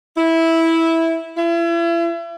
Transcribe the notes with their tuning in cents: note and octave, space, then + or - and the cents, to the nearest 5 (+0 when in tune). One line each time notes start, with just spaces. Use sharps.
E4 -10
E4 +40